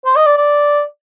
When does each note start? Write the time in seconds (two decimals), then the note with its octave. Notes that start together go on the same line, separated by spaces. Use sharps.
0.06 C5
0.16 D#5
0.26 D5
0.37 D5